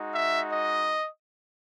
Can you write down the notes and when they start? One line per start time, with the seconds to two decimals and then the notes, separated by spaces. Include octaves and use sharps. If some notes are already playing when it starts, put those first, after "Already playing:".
Already playing: G#3 D#4 F#4
0.13 E5
0.52 D#5